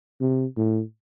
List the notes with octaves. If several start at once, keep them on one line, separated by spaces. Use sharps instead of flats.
C3
A2